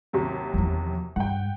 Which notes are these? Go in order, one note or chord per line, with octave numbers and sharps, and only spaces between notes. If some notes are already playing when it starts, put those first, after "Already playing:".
D#2 C3 F#3
E2 F3
G2 F#5 G5